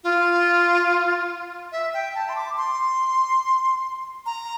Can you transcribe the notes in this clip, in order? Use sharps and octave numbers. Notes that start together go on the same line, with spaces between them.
F4
E5
G5
A5
C6
D6
C6
A#5